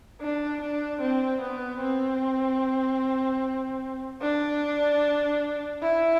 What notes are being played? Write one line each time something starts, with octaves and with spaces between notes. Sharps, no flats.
D4
D4
C4
B3
C4
D4
E4